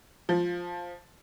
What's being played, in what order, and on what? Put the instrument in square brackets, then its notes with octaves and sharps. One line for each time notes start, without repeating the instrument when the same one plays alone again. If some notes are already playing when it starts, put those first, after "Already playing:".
[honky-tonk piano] F3